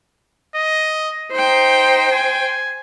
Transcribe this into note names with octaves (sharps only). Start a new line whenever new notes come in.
D#5
D#4 C5 G5
G#5